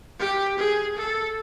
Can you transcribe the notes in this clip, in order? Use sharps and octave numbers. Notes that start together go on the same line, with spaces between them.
G4
G#4
A4